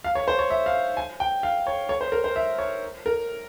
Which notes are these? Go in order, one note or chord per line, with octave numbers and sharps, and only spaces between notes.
F5
C#5
C5
C#5
E5
F5
G#5
G5
F5
C#5
C#5
C5
A#4
C5
E5
C#5
A#4